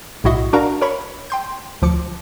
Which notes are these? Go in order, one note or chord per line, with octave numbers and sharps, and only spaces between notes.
B1 A2 E4 F#4 D#5 E5
D4 F#4 A#4 F5 A#5
A#4 C#5 B5 C#6
G5 C6 G6
D2 F3 D6 C#7